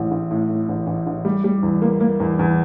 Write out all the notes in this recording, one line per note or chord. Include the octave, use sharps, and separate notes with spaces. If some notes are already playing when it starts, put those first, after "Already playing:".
Already playing: A1 A2
A1
A2
A2
A1
A1
A1
G3
G3
E2
A#3
A#3
E2
E2